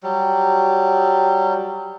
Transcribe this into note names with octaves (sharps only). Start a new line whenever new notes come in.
F#3 G3